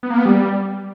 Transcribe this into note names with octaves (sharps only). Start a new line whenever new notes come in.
B3
A#3
B3
G3